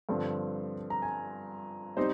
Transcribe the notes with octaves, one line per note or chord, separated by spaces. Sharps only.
G2 D3 F3 C4
A#5
G#5
G3 C4 D#4 C5